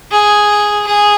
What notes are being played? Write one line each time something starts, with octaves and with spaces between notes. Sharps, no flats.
G#4
G#4